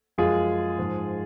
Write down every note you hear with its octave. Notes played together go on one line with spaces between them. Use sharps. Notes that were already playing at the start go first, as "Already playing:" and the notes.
F#2 F3 G#3 F4 G#4
G#2 F3 G#3